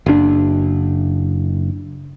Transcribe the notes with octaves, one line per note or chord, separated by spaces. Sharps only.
F#1 D4